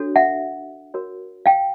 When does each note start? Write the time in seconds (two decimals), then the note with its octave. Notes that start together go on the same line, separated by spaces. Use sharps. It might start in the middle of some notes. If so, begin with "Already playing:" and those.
Already playing: D4 F#4 A4 C#5
0.16 E5 F#5
0.94 F#4 A#4 C#5
1.46 F5 G5